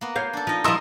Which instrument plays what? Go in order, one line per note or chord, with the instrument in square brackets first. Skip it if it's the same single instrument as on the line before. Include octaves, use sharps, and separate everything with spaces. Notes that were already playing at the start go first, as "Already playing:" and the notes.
[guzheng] A#3 B3
[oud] C#5 F5 [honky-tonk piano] G6
[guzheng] D4 A4
[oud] F3 [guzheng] D#4 D#5
[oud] F3 G3 [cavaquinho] E4 D#5 [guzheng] A#4 [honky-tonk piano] C6 D#6 E6